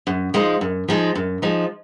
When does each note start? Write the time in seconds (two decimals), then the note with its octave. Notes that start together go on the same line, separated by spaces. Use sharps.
0.07 F#2
0.34 F3 G#3 D#4
0.61 F#2
0.88 F3 G#3 D#4
1.15 F#2
1.42 F3 G#3 D#4